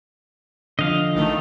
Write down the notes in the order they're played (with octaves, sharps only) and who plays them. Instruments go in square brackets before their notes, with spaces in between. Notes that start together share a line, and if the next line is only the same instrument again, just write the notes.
[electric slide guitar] D3 F3 [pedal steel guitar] D#5 F5
[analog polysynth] A1 D#3 A3